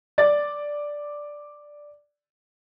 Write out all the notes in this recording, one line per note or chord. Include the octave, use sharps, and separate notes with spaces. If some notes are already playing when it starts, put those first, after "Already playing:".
D5 A6